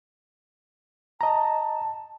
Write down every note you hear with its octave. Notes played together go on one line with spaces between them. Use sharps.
D#5 A5 A#5